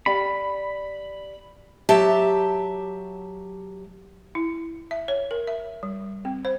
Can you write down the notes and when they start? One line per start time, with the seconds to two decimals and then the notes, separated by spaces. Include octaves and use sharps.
0.06 G4 D5 F5 B5
1.89 F#3 G4 E5 A5
4.35 E4
4.91 E5
5.08 C#5
5.31 A#4
5.47 E5
5.83 G3
6.25 C4
6.45 C5